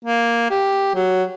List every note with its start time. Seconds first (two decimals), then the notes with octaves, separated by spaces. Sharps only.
0.04 A#3
0.50 G4
0.95 F#3